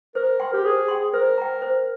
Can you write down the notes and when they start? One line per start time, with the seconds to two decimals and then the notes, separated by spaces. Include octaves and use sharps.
0.15 A#4 C5
0.40 G5 C6
0.53 G4
0.64 G#4 C5
0.88 G5 C6
1.13 A#4 C5
1.38 G5 A#5
1.62 C5